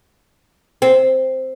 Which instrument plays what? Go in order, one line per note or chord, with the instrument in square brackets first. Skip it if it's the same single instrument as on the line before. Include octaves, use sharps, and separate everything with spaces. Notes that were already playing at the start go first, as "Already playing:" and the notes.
[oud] C4